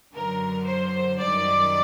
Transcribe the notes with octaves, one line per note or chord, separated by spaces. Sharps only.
F#2 D3 F#3 A#4
C5
F#2 D#3 G3 D5